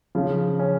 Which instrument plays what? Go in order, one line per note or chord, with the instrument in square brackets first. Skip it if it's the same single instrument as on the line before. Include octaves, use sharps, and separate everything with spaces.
[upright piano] C#3 [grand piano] F3
[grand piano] C#4